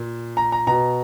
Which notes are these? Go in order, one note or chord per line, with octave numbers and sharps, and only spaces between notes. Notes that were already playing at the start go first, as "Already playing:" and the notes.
Already playing: A#2
A#5
A#5
B2 A#5